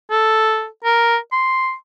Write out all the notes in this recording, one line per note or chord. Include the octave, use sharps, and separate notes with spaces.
A4
A#4
C6